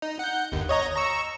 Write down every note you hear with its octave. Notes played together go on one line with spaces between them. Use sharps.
D#4
F#5 G6
G1 D#2
C#5 D#5 A#5
A#5 C#6 E6